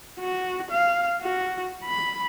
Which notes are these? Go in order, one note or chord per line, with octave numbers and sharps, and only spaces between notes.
F#4
F5
F#4
B5